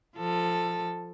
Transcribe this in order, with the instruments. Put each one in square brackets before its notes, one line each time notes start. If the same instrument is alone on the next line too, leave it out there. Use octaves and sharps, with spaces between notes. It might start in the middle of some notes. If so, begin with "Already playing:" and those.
[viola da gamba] F3 A4